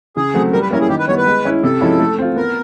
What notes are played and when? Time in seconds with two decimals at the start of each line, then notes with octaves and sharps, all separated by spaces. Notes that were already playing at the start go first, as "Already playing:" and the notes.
0.17 C#3 G#4
0.34 F#3 A3 C4
0.53 G3 A#4
0.62 B4
0.71 A#3 C#4 E4 A#4
0.81 G#4
0.89 D#3 G4
0.99 B4
1.08 G3 B3 C#5
1.17 B4
1.27 G#3
1.45 C#4 E4
1.64 C3 A4
1.81 F3 G#3 C#4 E4
2.00 A3
2.18 C4 F4
2.36 B3 A#4